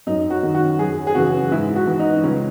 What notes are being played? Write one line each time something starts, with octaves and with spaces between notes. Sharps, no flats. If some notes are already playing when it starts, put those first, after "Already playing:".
F#2 D#4
F#4
D#3
F#4
F#2 G#4
G#4
C#3 E3 F#4
G#2 E4
F#4
E3
D#4
C#2 C#4